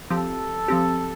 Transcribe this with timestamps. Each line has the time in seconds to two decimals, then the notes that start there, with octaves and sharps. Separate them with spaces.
0.10 F3 C4 G4 A4
0.68 F3 C4 G4